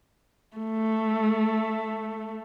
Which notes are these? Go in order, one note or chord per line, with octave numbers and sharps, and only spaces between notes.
A3